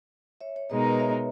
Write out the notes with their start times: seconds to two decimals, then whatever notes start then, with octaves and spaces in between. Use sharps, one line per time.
0.41 C#5 E5
0.56 C#5 E5
0.70 B2 G#3 D#4 A#4 B4 D#5
0.85 B4 D#5
0.99 C#5 E5